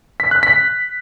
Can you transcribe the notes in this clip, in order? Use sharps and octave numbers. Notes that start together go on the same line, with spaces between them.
B6
F#6
B6